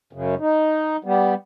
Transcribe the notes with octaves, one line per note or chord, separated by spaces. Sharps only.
F#2 C#3
D#4
G3 B3